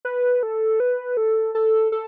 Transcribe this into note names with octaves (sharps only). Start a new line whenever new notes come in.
B4
A4
B4
A4
A4
A4